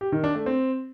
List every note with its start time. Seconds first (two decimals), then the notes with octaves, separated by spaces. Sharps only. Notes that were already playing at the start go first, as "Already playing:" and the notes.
0.01 G4
0.12 D#3
0.24 D4
0.35 A3
0.46 C4